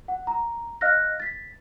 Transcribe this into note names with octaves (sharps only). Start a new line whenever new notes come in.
F#5
A#5
D#5 F5 F6 F#6 A#6
A6 B6